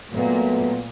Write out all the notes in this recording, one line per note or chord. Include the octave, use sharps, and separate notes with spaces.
A#2 F#3 A3 B3